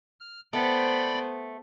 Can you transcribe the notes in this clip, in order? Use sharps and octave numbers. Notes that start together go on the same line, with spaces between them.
F6
A3 B3 C5 D5 G5 B5